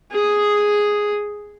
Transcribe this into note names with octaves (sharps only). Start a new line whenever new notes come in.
G#4 D#6